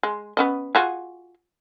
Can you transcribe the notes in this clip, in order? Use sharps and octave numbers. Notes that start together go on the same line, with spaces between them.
G#3
B3 C#4 D#5
F4 F#4 G#4